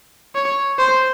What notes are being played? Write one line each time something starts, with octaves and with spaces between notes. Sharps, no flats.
C#5
C5